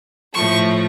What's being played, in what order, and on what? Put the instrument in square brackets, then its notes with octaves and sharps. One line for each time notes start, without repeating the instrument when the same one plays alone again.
[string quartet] A2 F3 A3 C#6